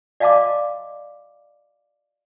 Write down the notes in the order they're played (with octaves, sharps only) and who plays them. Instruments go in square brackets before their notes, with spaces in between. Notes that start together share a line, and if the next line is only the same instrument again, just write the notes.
[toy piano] D5 D#5 F5 A5 C6 D6